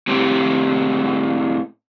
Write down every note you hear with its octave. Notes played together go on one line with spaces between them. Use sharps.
A2 C4 G4